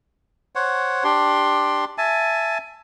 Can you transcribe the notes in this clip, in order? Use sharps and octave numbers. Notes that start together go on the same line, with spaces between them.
C5 C#5 F#5
D4 G4 C6
E5 G#5 A5